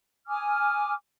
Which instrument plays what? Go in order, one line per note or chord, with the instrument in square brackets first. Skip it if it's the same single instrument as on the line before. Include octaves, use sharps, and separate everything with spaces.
[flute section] G#5 D6 D#6 F6